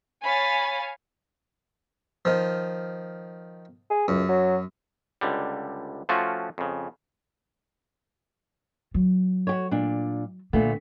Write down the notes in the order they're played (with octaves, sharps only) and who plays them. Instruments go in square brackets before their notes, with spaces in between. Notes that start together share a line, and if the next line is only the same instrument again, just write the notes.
[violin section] C#5 F5 G#5 [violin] B5 A6
[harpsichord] D#3 F3
[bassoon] G#4
[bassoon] C#2 [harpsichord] F#2
[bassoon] F#3
[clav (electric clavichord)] C#2 D3 G3
F3 A3 C#4 F4 F#4
F2 C#3
[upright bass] F#3
[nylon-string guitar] F#4 G4 C#5
A#2 D4
[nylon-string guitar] A#2 A3 B3 [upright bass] D3